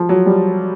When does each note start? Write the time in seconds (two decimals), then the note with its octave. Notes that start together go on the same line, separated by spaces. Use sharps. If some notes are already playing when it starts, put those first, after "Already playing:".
Already playing: F3
0.09 F#3
0.26 G3